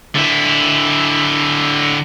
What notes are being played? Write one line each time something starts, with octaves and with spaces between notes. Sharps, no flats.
D3 E4